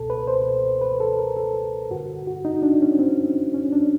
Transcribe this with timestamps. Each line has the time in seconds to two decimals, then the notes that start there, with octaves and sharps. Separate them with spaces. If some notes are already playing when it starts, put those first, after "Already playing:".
Already playing: C#2 B2 A4
0.10 B4
0.28 C5
0.82 B4
1.00 A4
1.19 A#4
1.37 A4
1.90 G2 D3 F#4
2.27 F#4
2.45 D#4
2.63 D4
2.82 C#4
2.99 C4
3.54 C#4
3.72 D4